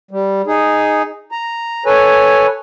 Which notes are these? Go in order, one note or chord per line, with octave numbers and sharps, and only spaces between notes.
G3
D#4 G#4
A#5
A4 B4 C#5 G#5